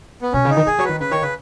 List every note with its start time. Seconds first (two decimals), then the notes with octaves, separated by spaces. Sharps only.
0.22 B3
0.33 B2 C#4
0.45 C#3
0.50 D#4
0.56 D#3
0.67 D#3 G#4
0.79 F#3 C#5
0.84 D#3 B4
1.00 C#3 B4
1.11 D#3 C#5
1.22 C#3 B4